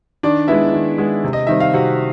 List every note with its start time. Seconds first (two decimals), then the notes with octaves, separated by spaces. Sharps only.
0.23 D#3 D4 D5
0.48 G#3 B3 E4 E5
0.74 D#3
0.98 G#3 B3
1.24 C3
1.33 D#5
1.47 D#3 G3 C4 E5
1.60 F5
1.73 C3 F#4 F#5